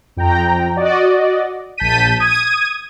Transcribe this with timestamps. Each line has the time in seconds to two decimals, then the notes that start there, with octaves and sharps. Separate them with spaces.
0.17 F2 G5 A#5
0.76 F#4 D5 D#5
1.78 A#1 A5 G6 B6 D#7
2.19 D#6 G#6 D#7